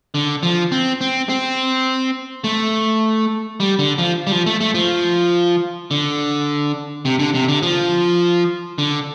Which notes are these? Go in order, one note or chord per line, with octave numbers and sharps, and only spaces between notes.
D3
F3
C4
C4
C4
A3
G3
D3
F3
G3
F3
A3
A3
F3
D3
C3
D3
C3
D3
F3
D3